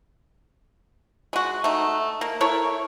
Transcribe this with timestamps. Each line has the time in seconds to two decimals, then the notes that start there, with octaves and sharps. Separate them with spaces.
1.33 G#3 F#4
1.64 A3 D#4
2.21 A#3
2.41 E4 A4 A#4 C#5